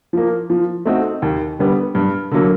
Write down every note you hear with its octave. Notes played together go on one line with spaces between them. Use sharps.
F3 A#3
F3
A3 C4 D#4 F#4
D#2
D3 G3 B3
G2
D3 F#3 A#3